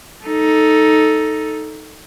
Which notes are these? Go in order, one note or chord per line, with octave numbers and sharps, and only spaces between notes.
D#4 A4